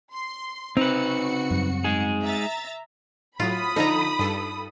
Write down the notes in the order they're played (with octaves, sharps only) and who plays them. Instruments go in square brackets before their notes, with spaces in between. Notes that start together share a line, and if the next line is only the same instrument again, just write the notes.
[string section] C6
[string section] C#3 F#4 C#7 [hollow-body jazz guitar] C4 [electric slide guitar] D#4 B4
[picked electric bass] F#2 F#3 G3
[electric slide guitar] G#3 D#4 G#4
[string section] E5 A#5 A6
[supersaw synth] A2 F#3 [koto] F4 [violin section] B5 D#6
[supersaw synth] D3 F3 A4 [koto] D#4 A#5
[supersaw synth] G2 A4